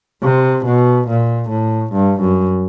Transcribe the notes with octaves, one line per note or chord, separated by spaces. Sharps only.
C3
B2
A#2
A2
G2
F#2